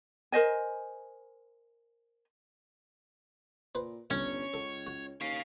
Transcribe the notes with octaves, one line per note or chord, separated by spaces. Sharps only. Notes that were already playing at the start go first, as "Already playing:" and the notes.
A#4 C5 D#5 G#5
A#2 B4 C5
G1 C2 C#4 C#5
C#2 A4
F#4
D#2 C#5 F5